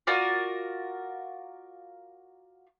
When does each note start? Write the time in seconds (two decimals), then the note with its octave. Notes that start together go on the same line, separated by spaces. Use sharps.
0.07 F4 F#4 A#4 D5